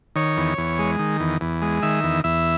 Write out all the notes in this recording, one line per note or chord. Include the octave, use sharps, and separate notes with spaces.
D#3 C#5
E2
E2
G#3
D#3
E2
E2
G#3
D#3 E5
E2
E2 E5